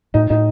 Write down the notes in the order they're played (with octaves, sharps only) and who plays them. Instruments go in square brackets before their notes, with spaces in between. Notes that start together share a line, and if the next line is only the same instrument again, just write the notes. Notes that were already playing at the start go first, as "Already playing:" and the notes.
[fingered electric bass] A2 [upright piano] D#4
[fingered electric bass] A2 [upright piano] D#4